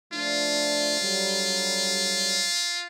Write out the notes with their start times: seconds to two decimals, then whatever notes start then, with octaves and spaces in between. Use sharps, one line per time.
0.13 F3 A3 D4 F4
1.00 D3 F#3 G3